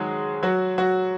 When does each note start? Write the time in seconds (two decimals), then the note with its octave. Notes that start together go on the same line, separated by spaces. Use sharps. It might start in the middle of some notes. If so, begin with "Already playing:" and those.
Already playing: D#3 F#3 G#3 F#4 G#4
0.43 F#3 F#4
0.78 F#3 F#4